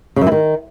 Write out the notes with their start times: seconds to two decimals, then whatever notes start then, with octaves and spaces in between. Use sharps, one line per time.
0.16 C#3
0.21 F#2
0.27 E3
0.32 D#3